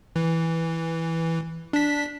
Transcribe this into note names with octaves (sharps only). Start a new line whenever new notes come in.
E3
D4 B6